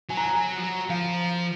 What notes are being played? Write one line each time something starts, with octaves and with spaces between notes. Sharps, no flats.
F#3 G#5
A#5
G#5
F#3
F3
F#3
F3 F5